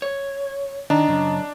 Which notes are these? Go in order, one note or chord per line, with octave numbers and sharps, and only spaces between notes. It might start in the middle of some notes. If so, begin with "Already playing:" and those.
C#5
D#3 D4 D#5 A#5
F#2 C#3